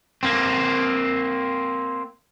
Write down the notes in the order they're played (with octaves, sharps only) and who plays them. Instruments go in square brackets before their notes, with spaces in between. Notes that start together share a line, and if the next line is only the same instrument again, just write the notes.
[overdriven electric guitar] A#3 C4